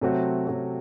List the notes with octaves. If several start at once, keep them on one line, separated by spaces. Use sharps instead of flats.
C3 F#3 A3 C4 F#4
C3 F#3 A3 C4 F#4